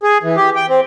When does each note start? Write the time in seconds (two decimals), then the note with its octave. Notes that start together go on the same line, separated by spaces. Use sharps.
0.03 G#4
0.23 E3
0.37 G4
0.56 G5
0.69 C4